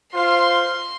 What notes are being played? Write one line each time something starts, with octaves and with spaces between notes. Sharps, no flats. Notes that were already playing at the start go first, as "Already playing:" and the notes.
F4 C5 F5 C6 C7